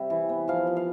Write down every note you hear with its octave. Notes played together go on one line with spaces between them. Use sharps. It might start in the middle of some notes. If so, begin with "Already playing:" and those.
Already playing: C3 G3 E5
E3
B3
F3 F5
F3
F5